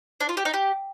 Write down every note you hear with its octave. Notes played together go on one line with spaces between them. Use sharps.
D4
F4
G4
D#4
G4